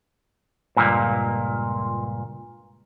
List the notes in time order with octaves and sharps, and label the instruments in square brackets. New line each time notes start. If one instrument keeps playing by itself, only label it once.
[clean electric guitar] C#2 G2 A#2